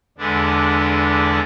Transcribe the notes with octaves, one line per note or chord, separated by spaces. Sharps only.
E2 D3 G#3 B3 D4